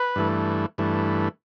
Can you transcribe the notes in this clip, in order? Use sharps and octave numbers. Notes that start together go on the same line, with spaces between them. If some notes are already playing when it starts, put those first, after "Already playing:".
Already playing: B4
G2 E3 A3
G2 E3 A3